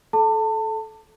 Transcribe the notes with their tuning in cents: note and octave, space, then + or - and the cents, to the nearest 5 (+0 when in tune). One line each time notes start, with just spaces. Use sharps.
A4 -25 A5 +30